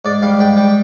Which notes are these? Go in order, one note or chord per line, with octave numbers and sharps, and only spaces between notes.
G#2 D5
G3 F5
G#2 G5
G3 G5